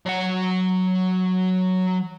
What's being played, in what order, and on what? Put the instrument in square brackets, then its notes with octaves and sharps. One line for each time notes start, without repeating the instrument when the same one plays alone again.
[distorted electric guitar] F#3 F#5